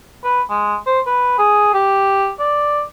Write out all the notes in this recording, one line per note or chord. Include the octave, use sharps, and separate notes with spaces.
B4
G#3
C5
B4
G#4
G4
D5